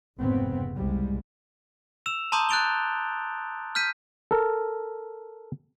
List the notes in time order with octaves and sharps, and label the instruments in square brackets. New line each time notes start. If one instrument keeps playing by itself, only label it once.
[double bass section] F1 G#2 C#3 B3 C4
C2 G3 G#3
[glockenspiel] E6 E7 F7
A5 A#5 C6 D6 D#6 G6
F#6 G6 A6 D7 F7 G7
F6 G6 B6 D#7
[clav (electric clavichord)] A4 A#4